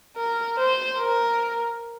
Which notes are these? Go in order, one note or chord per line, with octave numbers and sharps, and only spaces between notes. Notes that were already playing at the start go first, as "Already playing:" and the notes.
A#4
C5
A#4